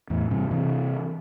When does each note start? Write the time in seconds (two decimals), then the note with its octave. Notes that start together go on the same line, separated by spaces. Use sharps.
0.10 E2 A2
0.31 G2 C3
0.51 C3 E3